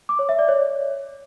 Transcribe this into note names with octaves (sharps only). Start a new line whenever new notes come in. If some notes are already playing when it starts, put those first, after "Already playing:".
D6
C#5
E5
D5
C#5